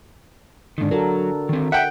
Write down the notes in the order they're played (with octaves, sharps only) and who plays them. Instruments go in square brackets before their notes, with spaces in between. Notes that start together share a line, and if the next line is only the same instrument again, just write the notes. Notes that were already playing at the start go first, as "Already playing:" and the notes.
[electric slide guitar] G#2 D#3 [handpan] D3 D4
[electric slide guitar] F#3 [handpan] F#4 A4 A#4
[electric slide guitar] D#3 C4
[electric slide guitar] E5 [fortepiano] F#5 G5